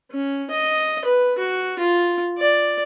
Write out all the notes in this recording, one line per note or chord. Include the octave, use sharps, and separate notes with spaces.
C#4
D#5
B4
F#4
F4
D5